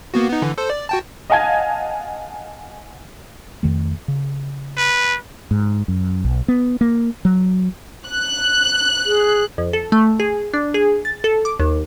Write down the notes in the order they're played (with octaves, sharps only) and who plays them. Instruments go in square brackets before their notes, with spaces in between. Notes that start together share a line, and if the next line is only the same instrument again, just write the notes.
[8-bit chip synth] A#3 B3 F#4
B3 D#4
D3 E3
A4 C5
D5
F#4 G5 A5
[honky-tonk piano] D#5 F5 F#5 G#5 A5 G#6
[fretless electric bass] F2 D#3 A3
C#3
[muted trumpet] B4
[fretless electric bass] G#2
F#2
B1
B3
A#3
F#3
[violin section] F#6
[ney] G#4
[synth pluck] F2
A4
A3
G#4
D4
G#4
A6
A4
D6
D#2